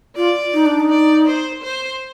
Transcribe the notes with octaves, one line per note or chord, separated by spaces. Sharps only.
F4 D5
D#4
D4
D#4
D5
C5
C5